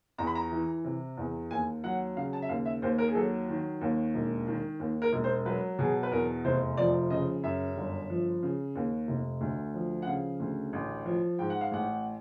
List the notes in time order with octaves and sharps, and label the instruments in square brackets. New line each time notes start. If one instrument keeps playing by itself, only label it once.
[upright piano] E2 A#5
B5
A#5
E3
C3
E2
D#2 G#5
F#3 F#5
C#3 F5
A5
E5
D#2 F5
E5
D#2 C5
A#4
G#4
F#3 A4
D#3
D#2
E1
D#3
D#2
A#4
E1
C5
F#3 B4
B2 G#4
B4
E2 A#4
F1 C5
F3 D5
C#3 D#5
F#2 E5
G1
F3
C#3
D#2
F1
D2
F3
F#5
C#3 F5
D2
A1
F3
G#2 G5
F#5
F5
A1 F#5